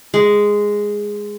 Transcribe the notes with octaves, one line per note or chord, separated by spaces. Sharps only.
G#3